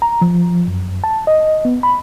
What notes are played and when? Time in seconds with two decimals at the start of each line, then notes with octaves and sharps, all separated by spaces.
0.02 A#5
0.21 F3
0.68 F#2
1.04 A5
1.27 D#5
1.65 B3
1.83 B5